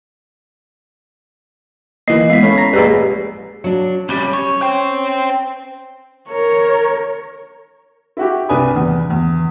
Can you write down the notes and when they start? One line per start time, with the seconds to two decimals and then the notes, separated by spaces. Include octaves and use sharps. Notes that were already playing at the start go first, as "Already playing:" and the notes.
2.08 E3 A#3 D#5 C7
2.30 G#3 B3 B6 C7
2.43 A3 C#4 B5
2.58 A#5 A#6
2.73 A#1 G4 G#4 B4 D5 D#5
3.64 F#3 D4
4.09 C2 G3 C#4
4.34 C#5
4.62 C5 G5
6.30 A#4 C#5
8.17 E4 F#4 G4
8.49 C2 D4 B4 G#5 B5 D#6
8.75 E2
9.10 E2